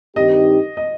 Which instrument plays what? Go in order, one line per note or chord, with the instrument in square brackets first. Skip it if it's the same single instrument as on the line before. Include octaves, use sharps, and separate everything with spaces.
[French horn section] G2 D#3 C4 D#4 G4 [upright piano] D#5
[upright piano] D#5